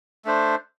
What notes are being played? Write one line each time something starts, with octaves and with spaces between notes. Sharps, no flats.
A3 D4 C5